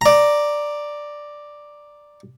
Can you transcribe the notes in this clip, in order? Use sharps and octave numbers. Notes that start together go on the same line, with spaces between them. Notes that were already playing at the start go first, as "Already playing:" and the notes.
D5 A#5